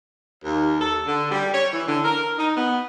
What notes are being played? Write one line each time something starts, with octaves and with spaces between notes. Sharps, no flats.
D#2
A4
D3
G3
C#5
E3
D3
A#4
D#4
B3